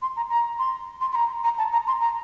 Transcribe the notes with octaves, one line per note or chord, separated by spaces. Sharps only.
C6
A#5
A#5
C6
C6
C6
A#5
A#5
A5
A#5
C6
A#5